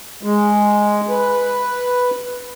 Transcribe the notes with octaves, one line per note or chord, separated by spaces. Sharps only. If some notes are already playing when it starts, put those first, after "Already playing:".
G#3
B4